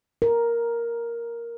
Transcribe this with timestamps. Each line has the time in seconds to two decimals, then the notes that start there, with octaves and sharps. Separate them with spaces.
0.22 A#4